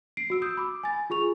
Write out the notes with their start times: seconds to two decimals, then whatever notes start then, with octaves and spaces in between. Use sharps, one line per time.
0.17 C7 D7
0.30 F#4 E6 D7
0.42 D#6 E6 G6
0.57 B5 D6
0.83 G#5 A6
1.10 F4 G#4 C#6 F7